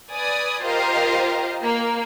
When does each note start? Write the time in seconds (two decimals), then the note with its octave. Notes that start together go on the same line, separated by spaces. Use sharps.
0.10 B4 D5 G#5 D#6
0.62 F4 G4 A#4 C5 D#5 F5
1.63 A#3